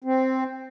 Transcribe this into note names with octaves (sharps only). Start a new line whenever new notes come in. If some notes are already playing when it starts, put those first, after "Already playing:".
C4